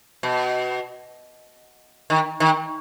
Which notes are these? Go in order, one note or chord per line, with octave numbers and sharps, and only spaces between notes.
B2
D#3
D#3